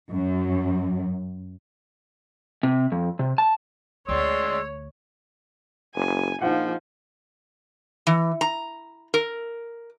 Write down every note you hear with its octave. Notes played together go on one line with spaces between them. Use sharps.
F#2
C3
F2
C3
A5
D2 G#3 C#5 D5 C6 E6
F#1 G#5
A#1 F3 D#4 F5 F#5
E3
A#5
A#4